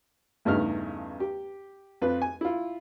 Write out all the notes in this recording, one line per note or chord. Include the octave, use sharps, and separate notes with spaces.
E2 G2 C#3 A3 D#4 F6
G4
F2 F4 B4
G#5
E4 F4